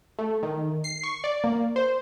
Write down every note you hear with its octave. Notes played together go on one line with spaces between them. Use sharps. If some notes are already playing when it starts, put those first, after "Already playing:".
A3
D#3
C7
C#6
D5
A#3
C5